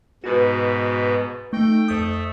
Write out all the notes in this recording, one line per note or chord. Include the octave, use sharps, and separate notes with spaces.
G#2 B2 F#4 B4
A3 D#4 G5
F2 A3 D#6